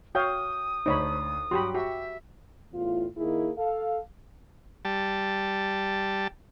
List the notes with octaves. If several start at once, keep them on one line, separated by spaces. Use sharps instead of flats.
F#4 C#5 F5 G5 D#6 G6
D2 D4 D#4 C5 C#5 B5
G2 F#3 F#4 G4 B5 C6
F#4 G4 E5
E2 A2 F4
D#3 A#3 E4 G#4
A4 F5
G3 A5